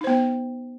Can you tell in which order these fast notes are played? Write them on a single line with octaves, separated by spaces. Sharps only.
D#4 C5 B3